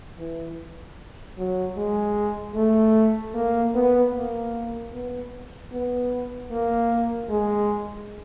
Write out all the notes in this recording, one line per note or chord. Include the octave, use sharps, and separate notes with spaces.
E3
F#3
G#3
A3
A#3
B3
A#3
B3
B3
A#3
G#3